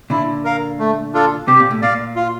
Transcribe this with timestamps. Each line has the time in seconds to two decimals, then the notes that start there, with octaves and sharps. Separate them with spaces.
0.10 A#2 D3 E4
0.45 A#4 F5
0.79 A3
1.14 D4 F4 A4
1.47 C3 G4
1.60 A#2
1.71 A2
1.82 A#2 D5 F5
2.16 F4